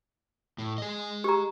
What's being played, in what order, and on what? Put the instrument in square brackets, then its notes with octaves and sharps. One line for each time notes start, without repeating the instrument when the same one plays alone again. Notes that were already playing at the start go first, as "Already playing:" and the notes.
[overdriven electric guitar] A2
G#4 D#5
[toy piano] G4 A#5